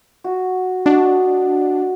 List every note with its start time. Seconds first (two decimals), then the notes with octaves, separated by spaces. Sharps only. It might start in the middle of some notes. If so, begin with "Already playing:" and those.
0.24 F#4
0.86 D4 F#4 D#5